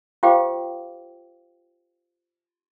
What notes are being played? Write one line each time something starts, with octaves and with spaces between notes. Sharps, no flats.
F4 G4 C5 F5 G5 D6